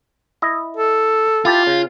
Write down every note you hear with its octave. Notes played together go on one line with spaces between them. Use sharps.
E4 D#5
A4
E4 F4 G4 A5
C#3